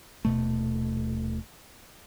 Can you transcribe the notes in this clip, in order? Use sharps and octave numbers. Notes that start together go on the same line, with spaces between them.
D#1 B2 A3